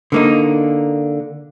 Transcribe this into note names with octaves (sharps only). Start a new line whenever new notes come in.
D3 A#3 D#4